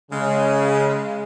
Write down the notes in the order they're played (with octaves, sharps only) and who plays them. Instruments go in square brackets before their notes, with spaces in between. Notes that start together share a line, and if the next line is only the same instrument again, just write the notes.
[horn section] C#3 [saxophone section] G#3